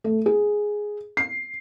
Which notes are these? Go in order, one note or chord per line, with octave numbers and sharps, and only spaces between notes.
A3
G#4
C7